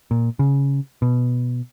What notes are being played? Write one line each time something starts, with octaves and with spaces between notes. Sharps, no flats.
A#2
C#3
B2